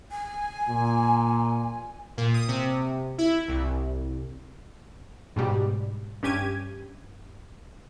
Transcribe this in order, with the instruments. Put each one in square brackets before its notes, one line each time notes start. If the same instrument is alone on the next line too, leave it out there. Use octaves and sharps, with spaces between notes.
[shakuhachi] G#5
[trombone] A#2
[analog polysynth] A#2
D#6
C3
E4
C2
[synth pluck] G#2 B2 G3
G2 C#4 G4 G#6 D#7